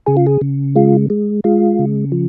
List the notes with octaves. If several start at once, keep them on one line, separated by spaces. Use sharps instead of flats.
C#3 G#4
F4
G#4
C#3
G#3 F4
G#3
G#3 F4
C#3
F3